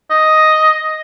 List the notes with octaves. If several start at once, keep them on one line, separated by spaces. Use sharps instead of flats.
D#5